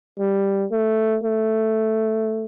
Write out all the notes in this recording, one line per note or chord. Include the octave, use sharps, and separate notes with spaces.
G3
A3
A3